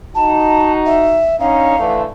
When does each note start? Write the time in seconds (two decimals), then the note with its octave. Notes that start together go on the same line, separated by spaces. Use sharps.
0.15 D#4 F#4 A5
0.86 E5
1.39 D3 C#4 D#4 F5
1.79 D3 E3 A3